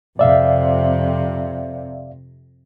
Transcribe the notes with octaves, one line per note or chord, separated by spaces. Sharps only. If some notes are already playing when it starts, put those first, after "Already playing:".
F2 C3 D5 E5 F5